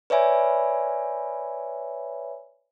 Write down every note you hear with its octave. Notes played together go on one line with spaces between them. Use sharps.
B4 C#5 D5 E5 G#5 B5